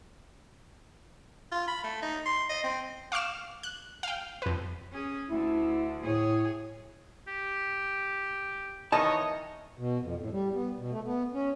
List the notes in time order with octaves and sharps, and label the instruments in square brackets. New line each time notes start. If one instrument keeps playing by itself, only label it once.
[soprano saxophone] F4
B5
A3
D#4
C6
D#5
C4
[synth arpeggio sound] F5 C#6 D6 F6 E7
F#6
F5 G5
F2 B4
[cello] C#4 G#4
[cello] D2 D3 [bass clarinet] E4
[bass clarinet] A2 [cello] G#4 C#5
[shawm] G4
[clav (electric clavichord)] D#3 E3 D#4 [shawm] C#5 [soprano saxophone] D#5 [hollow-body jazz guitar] A5
[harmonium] B2
F2
A2
G3
B3
B2
A3
B3
C#4